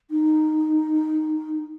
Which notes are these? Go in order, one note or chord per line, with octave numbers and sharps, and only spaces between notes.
D#4